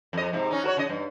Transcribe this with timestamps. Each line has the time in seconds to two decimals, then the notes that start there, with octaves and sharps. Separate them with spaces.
0.13 F2 D#5
0.33 G#2 C3
0.51 C#4 D#4
0.64 F#4 A#4 C#5
0.77 C#3 D#5
0.89 G2